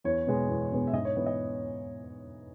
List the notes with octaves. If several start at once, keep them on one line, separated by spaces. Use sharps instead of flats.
E2 C#5
B2 G#3 B3
E2
B2 G#3 B3
E5
G#2 D#5
C#5
E3 B3 B4
D#5